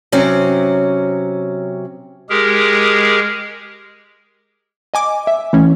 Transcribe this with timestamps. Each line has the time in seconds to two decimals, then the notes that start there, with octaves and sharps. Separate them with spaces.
0.12 C3 F#3 C4 C#4
2.29 G#3 G4 G#4 A#4
4.94 D#5 G#5 D6
5.27 E5
5.53 E3 A3 C#4